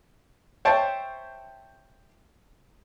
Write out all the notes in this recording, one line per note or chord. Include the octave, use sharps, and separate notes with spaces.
C5 C#5 E5 G5 A5